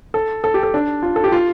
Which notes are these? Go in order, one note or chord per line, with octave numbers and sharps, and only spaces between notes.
A4
A4
G4
A4
D4
F4
A4
G4
F4